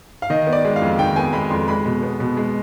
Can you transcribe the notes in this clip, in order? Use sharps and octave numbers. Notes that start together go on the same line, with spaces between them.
F5
D#3 D#5
B3
D5
G#3
F5
F2
D#3 G5
B3 G#5
G#3 B5
F2 C6
G#3 B5
B2
B3
B2
G#3